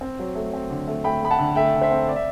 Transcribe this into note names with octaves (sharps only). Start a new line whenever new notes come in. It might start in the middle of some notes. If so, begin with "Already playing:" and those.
C4
F#3
A3
C4
D3
A3
A3 G5 B5
A3 B5
F#5 A5
D3
A3 E5 G5
D3
C5 E5
C4
D5
E5